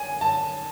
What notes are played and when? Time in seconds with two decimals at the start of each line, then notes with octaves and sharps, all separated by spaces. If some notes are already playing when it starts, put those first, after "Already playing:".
Already playing: G#5
0.21 A5